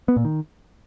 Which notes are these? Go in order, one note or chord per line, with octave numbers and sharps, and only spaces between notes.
B3
A#2
D#3